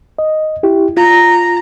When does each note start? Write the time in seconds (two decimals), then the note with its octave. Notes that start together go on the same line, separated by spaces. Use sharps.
0.19 D#5
0.63 E4 G4
0.97 F4 A#5